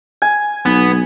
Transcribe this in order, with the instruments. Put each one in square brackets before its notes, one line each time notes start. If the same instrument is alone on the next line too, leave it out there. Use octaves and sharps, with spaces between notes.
[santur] G#5
[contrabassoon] B1 [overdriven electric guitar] B3